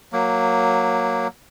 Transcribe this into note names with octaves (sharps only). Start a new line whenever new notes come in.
F#3 A#3